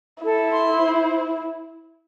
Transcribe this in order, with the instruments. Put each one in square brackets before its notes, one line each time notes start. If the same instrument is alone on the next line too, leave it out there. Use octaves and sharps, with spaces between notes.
[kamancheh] E4 [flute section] A4
[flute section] C6
C5